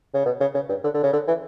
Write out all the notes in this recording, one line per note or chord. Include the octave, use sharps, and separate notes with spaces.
C#3
B2
C#3
C#3
G2
D3
D3
C#3
D3
E3